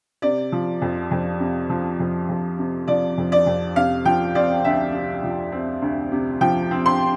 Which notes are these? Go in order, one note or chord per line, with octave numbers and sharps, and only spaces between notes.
C3 D5
F3
F2
F2
C3
F3
F2
F2
C3
F3 D5
F2
D5
F2
C3 F5
F3 G5
C4 D5
D2 E5
C3
F3
C4
D2
C3
F3 G5
C4
C6